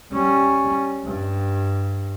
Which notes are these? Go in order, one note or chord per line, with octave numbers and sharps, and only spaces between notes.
G3 C#4
G2